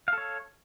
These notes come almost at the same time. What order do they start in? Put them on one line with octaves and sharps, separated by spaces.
F5 A4 C#5